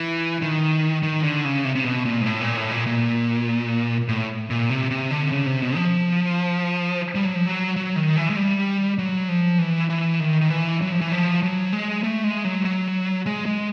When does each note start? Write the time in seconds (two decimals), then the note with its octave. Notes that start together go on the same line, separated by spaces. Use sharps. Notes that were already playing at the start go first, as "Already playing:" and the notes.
Already playing: E3
0.42 D#3
1.03 D#3
1.24 D3
1.45 C#3
1.65 C3
1.75 C3
1.85 B2
2.05 A#2
2.21 G#2
2.26 A2
2.41 A#2
2.57 A2
2.71 A#2
2.87 A#2
4.08 A2
4.50 A#2
4.70 C3
4.91 C3
5.11 D3
5.32 C#3
5.46 C3
5.62 B2
5.77 F3
7.15 G3
7.25 F#3
7.35 F3
7.46 F#3
7.76 F#3
7.96 D#3
8.17 E3
8.30 G#3
8.37 G3
8.98 F#3
9.29 F3
9.58 E3
9.90 E3
10.20 D#3
10.41 D#3
10.50 E3
10.82 F#3
10.92 F3
11.01 E3
11.12 F3
11.43 F#3
11.72 G#3
12.04 A3
12.24 G#3
12.45 F#3
12.65 F#3
13.26 G#3
13.46 G#3